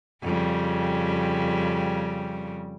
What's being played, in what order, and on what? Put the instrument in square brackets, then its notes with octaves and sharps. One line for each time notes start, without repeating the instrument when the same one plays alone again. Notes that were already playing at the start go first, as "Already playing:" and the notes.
[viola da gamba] F2 C#3 G3